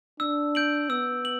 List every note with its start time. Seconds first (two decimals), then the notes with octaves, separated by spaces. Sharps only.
0.20 D4 E6
0.55 G6 D7 F#7
0.90 B3 E6
1.25 F#7